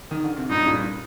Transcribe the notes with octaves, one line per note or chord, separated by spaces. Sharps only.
D#3
D3
C3
G2 A#2 D#4
G2 A#2